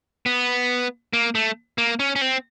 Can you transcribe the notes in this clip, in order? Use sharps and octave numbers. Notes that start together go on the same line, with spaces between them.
B3
A#3
A3
A#3
C#4
C#4
C4